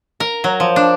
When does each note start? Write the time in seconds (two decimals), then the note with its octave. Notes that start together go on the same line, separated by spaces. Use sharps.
0.20 A#4
0.44 F#3
0.60 F3
0.76 D4